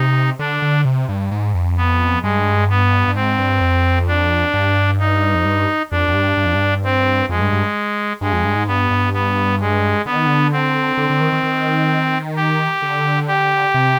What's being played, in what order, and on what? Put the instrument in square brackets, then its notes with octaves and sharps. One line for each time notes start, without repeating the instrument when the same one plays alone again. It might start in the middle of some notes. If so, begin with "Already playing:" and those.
Already playing: [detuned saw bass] C3 [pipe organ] D#4
[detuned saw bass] D3 [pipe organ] D4
[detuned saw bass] D3
C3
G2
G#2
F2
[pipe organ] B3
[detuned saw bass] G2 [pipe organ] G#3
[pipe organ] B3
[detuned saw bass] G2
[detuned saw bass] G#2 [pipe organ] C4
[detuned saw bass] G2
F2
[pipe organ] D4
[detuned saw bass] G2
[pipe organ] D#4
[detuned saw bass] F2
G2
[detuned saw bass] F2 [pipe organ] D4
[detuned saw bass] F2
G2
G2
F2
G2
[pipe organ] C4
[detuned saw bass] F2 [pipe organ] G#3
[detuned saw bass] G2
G2
[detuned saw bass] G2 [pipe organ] G#3
[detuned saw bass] F2
G2
G#2
[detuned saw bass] G2 [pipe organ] B3
[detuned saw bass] G2
[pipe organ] B3
G#3
[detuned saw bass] D3 [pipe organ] B3
[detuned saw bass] D#3
D3
[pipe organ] C4
[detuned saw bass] D3
D3
D#3
D#3
D#3
[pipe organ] G4
[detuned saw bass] D3
[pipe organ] G4
[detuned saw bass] C3